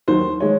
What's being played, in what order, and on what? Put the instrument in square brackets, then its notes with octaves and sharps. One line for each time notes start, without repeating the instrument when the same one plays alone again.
[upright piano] D#2 D#3 F#3 C5
D#3 G#3 C#5